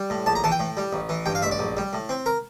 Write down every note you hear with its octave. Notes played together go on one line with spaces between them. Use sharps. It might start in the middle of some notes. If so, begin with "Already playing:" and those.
Already playing: G3
A2
A#1 A5
A#5
E3 A5
G5
A2
G3
A1
E3
G2 G5
F5
A1 E5
D5
A#1
G3
A2
C4
A#4